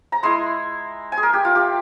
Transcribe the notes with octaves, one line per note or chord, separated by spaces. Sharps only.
A#5
G#3 E4 C6
G#5
G#4
A#4
G4
F4
G4